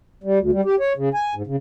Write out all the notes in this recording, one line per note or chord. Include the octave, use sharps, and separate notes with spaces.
G3
D2
G3
G4
C#5
C#3
G#5
G#2
C#3